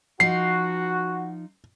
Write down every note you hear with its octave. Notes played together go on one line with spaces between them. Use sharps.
F3 D#4 F#4 C7